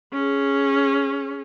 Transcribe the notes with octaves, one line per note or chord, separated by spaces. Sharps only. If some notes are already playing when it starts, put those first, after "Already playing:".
C#4 G#4